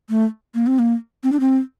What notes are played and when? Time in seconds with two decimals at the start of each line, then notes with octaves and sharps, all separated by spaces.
0.10 A3
0.55 A#3
0.67 C4
0.79 A#3
1.24 C4
1.32 D4
1.40 C4